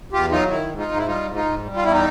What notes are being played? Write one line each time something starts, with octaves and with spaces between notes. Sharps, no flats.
E2 F4 G4
F#3 D#4 F4
D#3 E4
G#2
D#4 F4
G#2
E4
G3 D#4 F4
G#2
D#4 F4
G#2
G3
F4
E2 E4
D#4